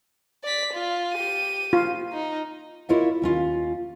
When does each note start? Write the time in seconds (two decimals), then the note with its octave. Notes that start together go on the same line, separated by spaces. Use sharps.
0.44 D5 B6
0.73 F4
1.13 G4 D#7
1.73 F4
2.13 D#4
2.89 E4 F4 A#4 C#5 D#5 E5
3.22 D#2 C#4 F4